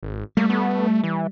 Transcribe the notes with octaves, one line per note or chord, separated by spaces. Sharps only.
G#1
G3 A3 A#3
B3
E3